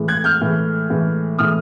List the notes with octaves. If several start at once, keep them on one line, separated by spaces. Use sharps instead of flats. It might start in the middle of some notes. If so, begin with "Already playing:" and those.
Already playing: A2 E3 G#3
F#6 G#6
F6 G6
A2 E3 G#3
A2 E3 G#3
A2 E3 G#3 D#6 F6